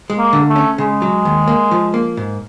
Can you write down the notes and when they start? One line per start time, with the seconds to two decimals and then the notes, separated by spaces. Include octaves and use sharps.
0.10 G#3
0.18 A#3
0.33 D3
0.48 A3
0.56 C#4
0.78 C#3 G#3
1.02 F#3
1.25 D#2
1.47 A#3
1.71 F3
1.94 A#3
2.17 G#2